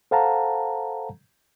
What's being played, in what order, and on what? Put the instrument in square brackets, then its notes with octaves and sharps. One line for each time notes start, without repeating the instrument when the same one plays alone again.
[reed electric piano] A4 C5 F5 F#5 A5 A#5